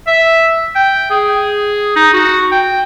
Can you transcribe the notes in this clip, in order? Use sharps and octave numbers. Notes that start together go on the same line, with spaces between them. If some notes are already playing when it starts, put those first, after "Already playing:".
E5
G5
G#4
D#4
F#4
G5